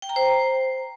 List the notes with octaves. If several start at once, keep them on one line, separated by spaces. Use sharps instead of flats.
G5
A#5
C5